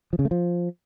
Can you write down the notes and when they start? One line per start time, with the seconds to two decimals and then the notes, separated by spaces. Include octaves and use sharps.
0.13 F3
0.19 C#3
0.25 A3
0.31 F3